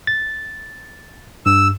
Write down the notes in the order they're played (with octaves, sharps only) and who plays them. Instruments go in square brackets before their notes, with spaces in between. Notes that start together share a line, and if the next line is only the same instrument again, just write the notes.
[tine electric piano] A6
[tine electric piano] G2 [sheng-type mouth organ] E6